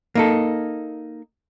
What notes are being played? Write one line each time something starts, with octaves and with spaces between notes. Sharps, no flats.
A#3 D#4 A4